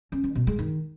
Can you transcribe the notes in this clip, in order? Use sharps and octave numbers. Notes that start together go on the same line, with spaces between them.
C#4
D#3
B2
G#3
D#3